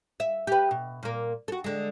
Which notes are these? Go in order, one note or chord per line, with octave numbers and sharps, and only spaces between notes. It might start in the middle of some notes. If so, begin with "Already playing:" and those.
E5
G4 B4
B2
A#2 A#3
F#4 A4
D3 G#3